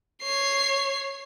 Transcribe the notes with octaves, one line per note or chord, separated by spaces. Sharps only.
C#5 C7